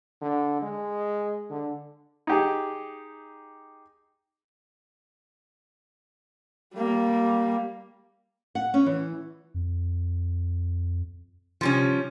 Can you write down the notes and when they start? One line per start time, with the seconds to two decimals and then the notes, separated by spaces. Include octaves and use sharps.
0.22 D3
0.62 G#3
1.50 D3
2.27 D#4 G4 G#4
6.75 G3 A#3
8.55 F#5
8.74 C#4
8.86 E3
9.54 F2
11.61 C3 F3 G3 C#4